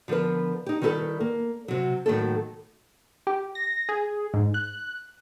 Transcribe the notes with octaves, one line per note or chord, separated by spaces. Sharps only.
D3 F3 B3 A#4 B4
D#4 G4
D#3 G3 E4 G#4 A4 B4
A#3
C3 F#3
A2 D#3 F#3 A3 A#3 A4
G4
A#6
G#4
G#2
F#6